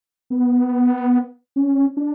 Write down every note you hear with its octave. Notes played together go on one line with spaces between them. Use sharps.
B3
C#4
D4